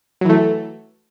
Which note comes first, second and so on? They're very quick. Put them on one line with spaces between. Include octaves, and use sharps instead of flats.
F#3 E3 A3